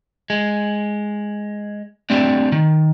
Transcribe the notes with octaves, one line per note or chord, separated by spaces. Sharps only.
G#3
G3 A3 C4 D4
D#3